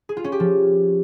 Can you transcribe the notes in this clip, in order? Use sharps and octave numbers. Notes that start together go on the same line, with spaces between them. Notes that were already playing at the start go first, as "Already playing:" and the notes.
G#4
F4
C#4
G4
F3